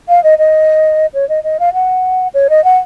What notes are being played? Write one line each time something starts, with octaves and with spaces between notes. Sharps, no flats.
F5
D#5
D#5
C#5
D#5
D#5
F5
F#5
C#5
D#5
F#5